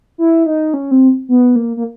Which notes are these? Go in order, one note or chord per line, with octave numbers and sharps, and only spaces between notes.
E4
D#4
C#4
C4
B3
A#3
A#3